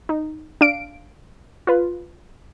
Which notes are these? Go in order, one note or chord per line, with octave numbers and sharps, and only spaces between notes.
D#4
D4 F5 D7
F4 B4